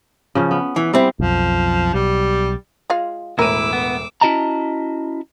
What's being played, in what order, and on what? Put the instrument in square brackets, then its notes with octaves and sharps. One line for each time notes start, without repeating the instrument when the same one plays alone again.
[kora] C#3 F3 C#4
B3
[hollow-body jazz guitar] E3
[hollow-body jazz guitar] G3 C4 [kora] E4
[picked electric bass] B1 F2 [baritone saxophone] F3
[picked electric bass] B1 [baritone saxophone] G3
[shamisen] G#3 F4 F5
[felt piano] E1 A2 D#7 [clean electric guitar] E4 [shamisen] A#4 [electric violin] D6 E6
[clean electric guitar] B3
C#4 E4 F#4 D#5 A5 A#5